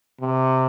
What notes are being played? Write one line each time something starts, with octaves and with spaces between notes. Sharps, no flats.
C3